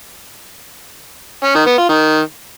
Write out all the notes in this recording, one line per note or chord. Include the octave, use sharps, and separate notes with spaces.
C#4
D#3
B3
F4
D#3